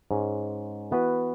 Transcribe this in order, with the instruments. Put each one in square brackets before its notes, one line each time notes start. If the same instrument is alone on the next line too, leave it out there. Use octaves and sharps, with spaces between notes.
[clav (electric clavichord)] G#2 G#3 C#4
E3 B3 F#4 B4